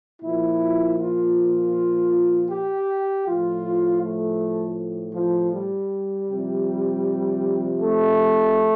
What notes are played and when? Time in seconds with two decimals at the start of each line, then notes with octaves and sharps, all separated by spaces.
0.22 A#2 F3 E4
0.98 F4
2.50 G4
3.26 A2 F3 F4
4.02 A3
5.15 F3
5.53 G3
6.29 C3 F3
7.81 A3